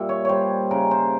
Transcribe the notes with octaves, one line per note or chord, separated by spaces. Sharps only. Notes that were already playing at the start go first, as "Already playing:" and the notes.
Already playing: A#2 G3 E5
C#5
G3 C5 C#5
C#3 A#4
C5